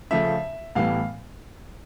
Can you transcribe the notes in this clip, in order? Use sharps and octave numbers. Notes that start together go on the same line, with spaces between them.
C#3 F3 A3 C#4 E5
A2 E3 G3 B3 F5